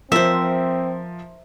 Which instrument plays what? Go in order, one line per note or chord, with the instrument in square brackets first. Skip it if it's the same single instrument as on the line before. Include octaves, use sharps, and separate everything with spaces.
[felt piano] F3 [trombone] C4 [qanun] A#4 C5 [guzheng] E5